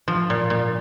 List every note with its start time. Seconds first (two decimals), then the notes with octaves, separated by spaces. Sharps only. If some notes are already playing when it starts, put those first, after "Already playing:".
0.08 F3
0.30 A#2
0.50 A#2